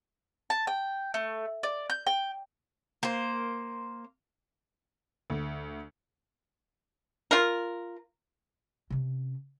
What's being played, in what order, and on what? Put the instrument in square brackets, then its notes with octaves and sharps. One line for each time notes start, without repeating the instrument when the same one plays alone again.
[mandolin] A5
G5
A3
D5
G6
G5
[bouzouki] A#3 C5
[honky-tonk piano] D2
[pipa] F4 A#4
[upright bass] C3 C#4